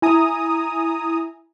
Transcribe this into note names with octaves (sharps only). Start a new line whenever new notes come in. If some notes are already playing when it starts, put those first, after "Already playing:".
E4 G#5 A#5 D#6